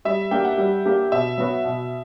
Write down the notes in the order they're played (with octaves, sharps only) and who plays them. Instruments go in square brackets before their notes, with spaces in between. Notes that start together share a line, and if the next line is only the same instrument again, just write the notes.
[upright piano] G3 [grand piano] E5
[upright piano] A#3 D4 G4 [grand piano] G5
[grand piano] F#5
[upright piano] G3
A#3 D4 G4
[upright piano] B2 [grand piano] E5
[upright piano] F#3 B3 F#4
B2